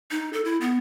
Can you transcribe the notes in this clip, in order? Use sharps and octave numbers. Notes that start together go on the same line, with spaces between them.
D#4
A4
E4
B3